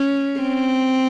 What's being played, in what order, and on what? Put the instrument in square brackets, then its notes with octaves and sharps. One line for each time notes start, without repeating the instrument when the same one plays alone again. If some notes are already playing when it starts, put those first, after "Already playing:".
Already playing: [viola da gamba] C#4
C4